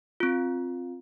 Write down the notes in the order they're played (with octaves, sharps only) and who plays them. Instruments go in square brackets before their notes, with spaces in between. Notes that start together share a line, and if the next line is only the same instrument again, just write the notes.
[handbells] C4 F4